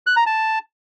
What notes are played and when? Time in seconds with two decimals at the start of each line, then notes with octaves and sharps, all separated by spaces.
0.07 F#6
0.16 A#5
0.26 A5